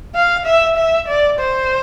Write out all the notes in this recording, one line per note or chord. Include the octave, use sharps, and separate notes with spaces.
F5
E5
E5
D5
C5